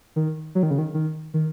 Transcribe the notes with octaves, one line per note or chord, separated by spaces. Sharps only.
D#3
F#3
D#3
C#3
D#3
D#3
D#3